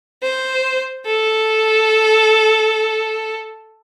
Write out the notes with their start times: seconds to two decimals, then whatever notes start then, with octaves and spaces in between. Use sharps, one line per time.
0.23 C5
1.06 A4